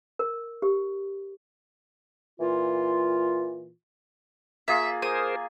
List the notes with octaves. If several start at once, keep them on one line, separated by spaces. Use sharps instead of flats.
A#4
G4
A#2 E3 F4
A#3 F4 G#4 E5
G#4 A#4 C5 G#5 D#6